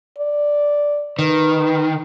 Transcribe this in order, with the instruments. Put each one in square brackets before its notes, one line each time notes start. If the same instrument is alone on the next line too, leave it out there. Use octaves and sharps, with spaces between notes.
[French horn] D5
[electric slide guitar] D#3 [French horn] B4